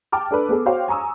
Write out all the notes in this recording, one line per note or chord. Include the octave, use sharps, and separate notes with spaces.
G5 A5 D6 F6
D4 A4 B4
B3 G#4 A4
F#4 C5 C#5 F5 G5
G#5 A#5 C#6 D#6 E6